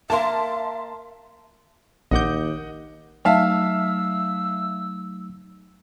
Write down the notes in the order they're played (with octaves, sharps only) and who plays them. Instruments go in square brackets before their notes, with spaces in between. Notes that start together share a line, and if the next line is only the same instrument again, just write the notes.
[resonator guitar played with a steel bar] A#3 A#4 F5 [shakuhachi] E5 [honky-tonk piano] A5 C6
[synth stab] A#1 G6 [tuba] D#2 [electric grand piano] D#5 F#5 D6
[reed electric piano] F#3 A3 D#4 [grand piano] E5 F5 A5 [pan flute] E6